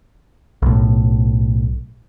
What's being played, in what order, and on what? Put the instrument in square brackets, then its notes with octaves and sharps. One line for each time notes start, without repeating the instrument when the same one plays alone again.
[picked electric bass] B1 A2